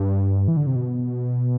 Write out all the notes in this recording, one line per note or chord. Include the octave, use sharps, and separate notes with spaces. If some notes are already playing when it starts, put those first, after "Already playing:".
Already playing: G2
E3
D3
C3
B2